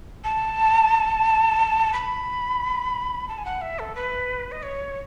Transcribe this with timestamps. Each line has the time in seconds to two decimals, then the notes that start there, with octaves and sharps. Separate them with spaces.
0.24 A5
1.93 B5
3.28 A5
3.38 G#5
3.45 F#5
3.61 E5
3.79 A4
3.95 B4
4.52 D#5
4.63 C#5